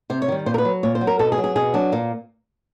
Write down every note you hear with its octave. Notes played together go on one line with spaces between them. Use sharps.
C3 C5
C#5
D#3 G3
A#2 C5
A#4
B4
F#3
A#2 C#5
C5
F#3
A#4
B2 A4
G#4
F#3
G#4
B2 G#4
F#3 D4
A#2 A#3